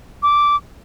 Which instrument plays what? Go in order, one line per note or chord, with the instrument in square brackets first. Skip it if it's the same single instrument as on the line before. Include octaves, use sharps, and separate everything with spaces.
[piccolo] D6